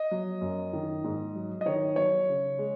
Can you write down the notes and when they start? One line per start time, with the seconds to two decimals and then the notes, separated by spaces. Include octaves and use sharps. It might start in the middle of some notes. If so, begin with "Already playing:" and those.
Already playing: D#5
0.11 F#3
0.41 F#2
0.73 D#3
1.04 G#2
1.35 F#3
1.61 D#5
1.66 D#3 C#5
1.96 F#3 C#5
2.28 C#3
2.58 G#3